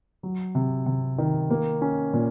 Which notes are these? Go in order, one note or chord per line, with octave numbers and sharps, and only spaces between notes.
F#3
C3
C3
D#3
A#3
C#4
A#2